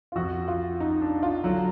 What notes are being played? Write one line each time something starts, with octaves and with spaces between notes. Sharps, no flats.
F4
F2 F3 F#4
F4
D#4
D4
F4
D3 F#3